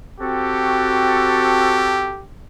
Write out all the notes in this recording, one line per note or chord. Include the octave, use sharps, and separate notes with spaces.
C4 F#4 G4 A4